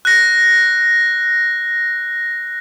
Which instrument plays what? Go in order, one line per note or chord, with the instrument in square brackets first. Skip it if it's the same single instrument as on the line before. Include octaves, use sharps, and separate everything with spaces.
[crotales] F#6 A#6